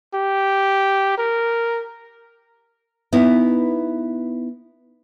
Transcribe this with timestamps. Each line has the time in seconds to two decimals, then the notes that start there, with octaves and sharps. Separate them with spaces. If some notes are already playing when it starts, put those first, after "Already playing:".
0.14 G4
1.18 A#4
3.13 B3 D#4 E4